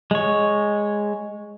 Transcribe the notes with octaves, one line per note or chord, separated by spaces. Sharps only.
G#3 C#5